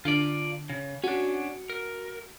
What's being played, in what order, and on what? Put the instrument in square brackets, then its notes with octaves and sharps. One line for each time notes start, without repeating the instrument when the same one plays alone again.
[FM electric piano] D3 [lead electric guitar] F4 D5
[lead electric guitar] C#3
[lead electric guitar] C#4 D4 [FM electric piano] F#4
[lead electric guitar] A#4